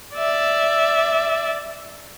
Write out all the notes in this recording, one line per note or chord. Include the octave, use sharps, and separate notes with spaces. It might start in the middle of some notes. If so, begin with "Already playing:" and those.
D5 E5